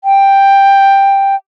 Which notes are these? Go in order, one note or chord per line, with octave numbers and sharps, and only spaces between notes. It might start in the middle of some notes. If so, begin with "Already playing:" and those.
G5